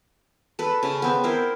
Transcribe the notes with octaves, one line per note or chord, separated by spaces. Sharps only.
A4 B4
C#3
B3 C4
E4 A#4 C5